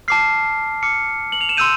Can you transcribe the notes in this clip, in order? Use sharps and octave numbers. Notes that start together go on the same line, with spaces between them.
A5 D6 F6 C7
A5 D6 F6 C#7
F#7
F7
E7
C6 E6 G6 D#7